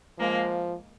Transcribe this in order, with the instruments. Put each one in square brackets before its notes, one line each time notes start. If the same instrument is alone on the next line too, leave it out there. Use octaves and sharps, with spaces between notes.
[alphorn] F3 [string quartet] G#3 A#3